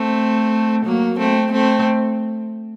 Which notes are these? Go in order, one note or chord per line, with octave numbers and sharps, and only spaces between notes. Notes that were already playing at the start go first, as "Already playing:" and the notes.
Already playing: A3 C4
F#3 A#3
A3 C4
A3 C4